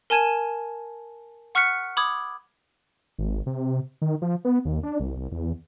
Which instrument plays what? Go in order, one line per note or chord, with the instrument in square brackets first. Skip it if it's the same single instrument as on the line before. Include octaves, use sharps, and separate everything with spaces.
[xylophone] A#4 G#5 A5 G#6 D#7 E7
F#5 C#6 F6 F#6 B6 C#7
B5 D6 D#6 G#6
[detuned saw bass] G#1
C3
D#3
F3
B3
D#2
D4
C2
C2
E2